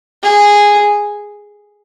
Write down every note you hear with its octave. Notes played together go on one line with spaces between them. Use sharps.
G#4